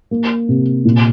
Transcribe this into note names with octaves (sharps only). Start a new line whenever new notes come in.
A#3
C3
A#2